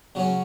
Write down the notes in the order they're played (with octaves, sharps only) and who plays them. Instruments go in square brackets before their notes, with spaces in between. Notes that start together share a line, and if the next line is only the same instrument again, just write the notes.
[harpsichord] C#3 F#3 C#4